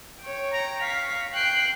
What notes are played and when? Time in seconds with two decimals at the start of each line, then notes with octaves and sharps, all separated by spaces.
0.22 C#5 G5
0.52 A#5
0.81 F5 C#6 B6
1.34 G5 F#6 C7